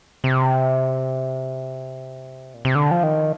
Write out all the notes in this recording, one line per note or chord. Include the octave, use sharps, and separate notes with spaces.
C3
A#2
C3
D3
F3
D#3